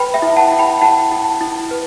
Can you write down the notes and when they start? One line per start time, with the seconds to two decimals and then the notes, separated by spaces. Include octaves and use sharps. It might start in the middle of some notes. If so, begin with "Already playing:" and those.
Already playing: B4 G5 B5
0.14 E5 G5
0.22 E4
0.37 F#5 A5
0.52 E4
0.59 G5 B5
0.81 E4 F#5 A5
1.12 E4
1.41 E4
1.71 B4